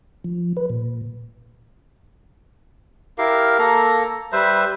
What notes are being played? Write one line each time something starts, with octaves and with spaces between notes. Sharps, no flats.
F3
B4
A#2
E4 G4 A#4 F5
A#3 A4 A#5
G3 B4 C5 E5